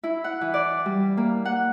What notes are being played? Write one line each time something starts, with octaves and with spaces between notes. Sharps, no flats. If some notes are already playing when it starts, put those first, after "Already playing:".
E4
F#5
E3
D5
G3
A#3
F#5